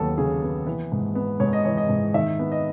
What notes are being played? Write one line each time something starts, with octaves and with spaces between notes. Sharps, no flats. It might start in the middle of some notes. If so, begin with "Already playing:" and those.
Already playing: D#2 F#3 B3 A4
C#3 G#4
B3
E3 B4
G#2
B3
G#2 C#5
D#5
E3 C#5
D#5
G#2
D#3 E5
B3
D#5